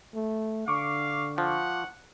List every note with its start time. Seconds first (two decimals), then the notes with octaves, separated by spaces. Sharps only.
0.14 A3
0.68 D3 F5 C#6 D6
1.38 F3 F#5